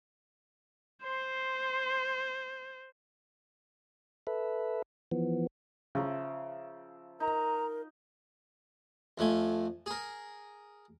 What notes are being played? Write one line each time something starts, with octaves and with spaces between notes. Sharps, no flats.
C5 C6
A4 B4 E5
E3 F3 B3
C#3 F3 E5 A#5
D#4 A#4 A#5
F2 F3 A3 G#5
G#4 A#4